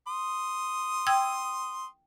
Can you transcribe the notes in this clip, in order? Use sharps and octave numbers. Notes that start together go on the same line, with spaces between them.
C6 D#6
G5 E6 G#6